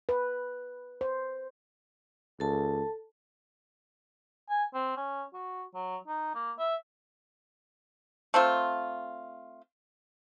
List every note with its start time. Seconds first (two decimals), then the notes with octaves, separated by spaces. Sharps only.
0.09 B4
1.01 C5
2.40 C#2 A4 A5
4.49 G#5
4.74 C4
4.97 C#4
5.34 F#4
5.75 F#3
6.08 D#4
6.35 A#3
6.59 E5
8.34 A3 C4 F4